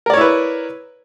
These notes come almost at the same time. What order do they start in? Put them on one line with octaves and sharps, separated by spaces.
A#4 D5 C#5 E4 B4